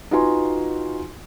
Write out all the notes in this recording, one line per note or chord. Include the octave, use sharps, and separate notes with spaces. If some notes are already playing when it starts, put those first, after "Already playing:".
D#4 F4 F#4 B4 G#5 C6